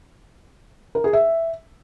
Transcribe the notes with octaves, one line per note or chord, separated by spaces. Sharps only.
A#4
G#4
E5